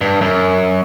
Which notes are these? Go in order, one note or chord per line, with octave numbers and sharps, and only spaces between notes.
G2
F#2